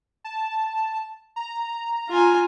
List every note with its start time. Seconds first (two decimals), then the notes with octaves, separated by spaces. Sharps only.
0.24 A5
1.36 A#5
2.09 F4 G#5